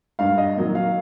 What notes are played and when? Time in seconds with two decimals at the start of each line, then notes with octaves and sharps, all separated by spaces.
0.19 G2 F5
0.38 D#5
0.57 D#3 F#3 A#3
0.75 F5